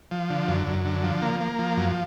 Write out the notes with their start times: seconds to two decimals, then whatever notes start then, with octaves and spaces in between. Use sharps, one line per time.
0.11 F3
0.30 D3
0.48 F#2
0.67 F#2
0.85 D3
1.04 F3
1.22 A#3
1.41 A#3
1.59 F3
1.77 F#2